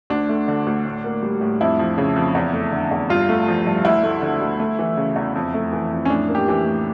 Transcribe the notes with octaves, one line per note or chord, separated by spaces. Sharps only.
D2 D4
A3
D3
D2
A2
A#3
G3
A2
F2 E4
F3
C#3
F2
E2
A3
D3
E2
G2 F4
A3
F3
G2
D2 E4
A3
D3
D2
A3
E3
C#3
E2
F2
A3
E3
F2
C#4
A2 D4
A#3
G4
E3
A2